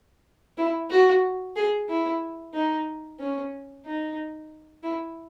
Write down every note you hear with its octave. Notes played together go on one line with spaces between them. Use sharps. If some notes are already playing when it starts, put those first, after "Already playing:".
E4
F#4
G#4
E4
D#4
C#4
D#4
E4